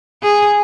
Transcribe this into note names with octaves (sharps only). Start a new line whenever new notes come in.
G#4